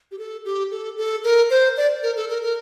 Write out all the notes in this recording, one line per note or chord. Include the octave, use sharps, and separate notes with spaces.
G4
A4
G4
A4
A4
A#4
C5
D5
A#4
A4
A#4
A#4